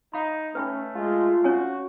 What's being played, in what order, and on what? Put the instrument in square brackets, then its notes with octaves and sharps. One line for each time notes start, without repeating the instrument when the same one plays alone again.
[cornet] D#4 [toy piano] F5 B5
[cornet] A3 [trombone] C#4 [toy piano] B4 G5 B5
[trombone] G#3 [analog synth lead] F4
[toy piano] C#4 C#5 G#5 [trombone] F#4